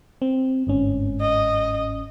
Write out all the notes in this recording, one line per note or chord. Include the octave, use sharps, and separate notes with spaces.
C4
G1 G#2 C#4
D#5